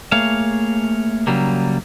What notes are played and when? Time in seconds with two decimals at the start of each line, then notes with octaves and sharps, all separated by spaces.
0.12 A3 A#3 G#4 C#5 F5
1.27 C#3 F#3 G3 A#3